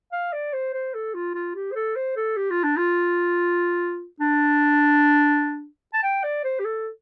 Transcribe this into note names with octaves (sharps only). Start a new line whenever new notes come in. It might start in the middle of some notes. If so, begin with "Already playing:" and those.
F5
D5
C5
C5
A4
F4
F4
G4
C5
A4
C5
A4
G4
F4
D4
F4
D4
A5
G5
D5
C5
G4
A4